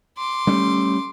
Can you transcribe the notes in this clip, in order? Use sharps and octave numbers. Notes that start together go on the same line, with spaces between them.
C6 D6
G3 A3 C#4